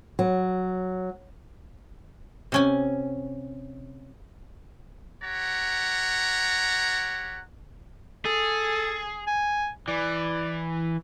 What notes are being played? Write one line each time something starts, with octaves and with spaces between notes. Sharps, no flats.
F#3
C3 C#4 G#5
G4 C#5 F#5 A#5
G#4 A4
G#5
E3 D5